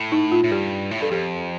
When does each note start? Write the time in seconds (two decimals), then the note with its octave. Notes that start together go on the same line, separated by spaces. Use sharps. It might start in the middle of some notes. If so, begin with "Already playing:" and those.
Already playing: A2
0.12 D#4
0.32 F4
0.44 A2
0.51 G2 G4
0.91 A2
1.01 G2 A4
1.11 F2 G4